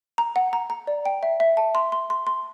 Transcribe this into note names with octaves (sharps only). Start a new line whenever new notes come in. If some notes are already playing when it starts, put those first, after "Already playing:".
A#5
F#5
A#5
A#5
D5
G5
E5
E5
A5
C6
C6
C6
C6